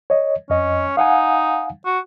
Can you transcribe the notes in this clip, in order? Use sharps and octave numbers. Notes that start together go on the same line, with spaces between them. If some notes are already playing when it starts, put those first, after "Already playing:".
C#5 D#5
F2 C#4 D#5
D#4 F5 F#5 G#5
F#4